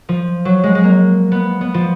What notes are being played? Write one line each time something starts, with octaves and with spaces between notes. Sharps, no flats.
F3
F#3
G#3
G#3
A#3
B3
B3
F3